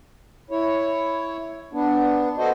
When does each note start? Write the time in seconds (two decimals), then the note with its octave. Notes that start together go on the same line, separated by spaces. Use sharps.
0.51 E4 C#5
1.73 B3 D4
2.38 B3 F#4 A4 C5 D#5